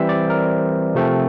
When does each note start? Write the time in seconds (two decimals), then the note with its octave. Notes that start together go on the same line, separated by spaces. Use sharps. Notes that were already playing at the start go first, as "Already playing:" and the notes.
Already playing: E3 G3 C4 C5 E5
0.09 D5
0.30 A#4
0.95 C3 F3 A3 C4